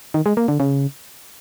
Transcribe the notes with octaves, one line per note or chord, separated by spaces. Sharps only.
D#3
G#3
A#3
D3
C#3